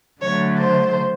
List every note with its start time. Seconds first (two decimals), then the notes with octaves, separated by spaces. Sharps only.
0.21 D3 F#3 A3 C#5
0.59 C5